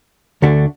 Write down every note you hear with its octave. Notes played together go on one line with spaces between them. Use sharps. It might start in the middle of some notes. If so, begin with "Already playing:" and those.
D2 D3 A3 D4 F#4